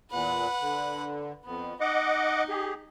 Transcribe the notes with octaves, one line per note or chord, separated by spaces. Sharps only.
E2 A#2 B4 F#5
D3
F2 B3
D#4 D#5 F#5 D6
G4 G#4